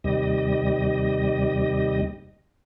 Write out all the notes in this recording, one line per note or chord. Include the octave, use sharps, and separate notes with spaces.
D#2 C3 G3 D#5